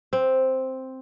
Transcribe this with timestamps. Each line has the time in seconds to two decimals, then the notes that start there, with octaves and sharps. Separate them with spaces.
0.13 C4